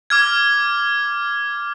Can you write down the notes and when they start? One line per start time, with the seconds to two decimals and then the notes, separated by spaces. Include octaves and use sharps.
0.10 D6 F6 G#6